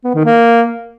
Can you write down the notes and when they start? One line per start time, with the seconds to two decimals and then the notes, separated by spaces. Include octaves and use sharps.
0.04 B3
0.15 D#3
0.25 A#3